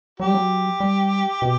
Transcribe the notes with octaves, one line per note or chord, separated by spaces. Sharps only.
F#3 G4
G3
F#3
G3
B2